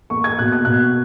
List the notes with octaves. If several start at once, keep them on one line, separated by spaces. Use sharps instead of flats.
A#3 C#6
G#6
B2 F#6
G#6
B2 F#6